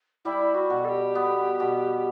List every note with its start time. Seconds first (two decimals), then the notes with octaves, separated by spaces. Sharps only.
0.25 G3 E4
0.55 F#4
0.70 B2
0.85 A4
0.89 G4
1.15 B3
1.60 B2